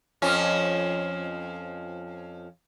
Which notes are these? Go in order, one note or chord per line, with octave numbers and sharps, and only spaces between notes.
F2 F3 C#4